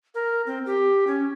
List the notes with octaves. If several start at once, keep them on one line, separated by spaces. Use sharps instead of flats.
A#4
C4
G4
C#4